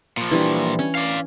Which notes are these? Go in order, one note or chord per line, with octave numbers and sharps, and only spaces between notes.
A#2 F3
E3 G3 D4
C#4
D5 F5